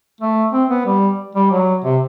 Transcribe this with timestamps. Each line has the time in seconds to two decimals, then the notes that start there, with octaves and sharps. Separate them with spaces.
0.21 A3
0.53 C4
0.70 B3
0.86 G3
1.35 G3
1.51 F#3
1.84 C3